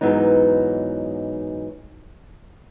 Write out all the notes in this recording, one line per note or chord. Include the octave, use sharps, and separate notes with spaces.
G#2 E3 F#3 B3 D#4